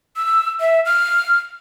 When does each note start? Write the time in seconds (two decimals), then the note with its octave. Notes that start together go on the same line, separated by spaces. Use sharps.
0.16 E6
0.60 E5
0.85 F6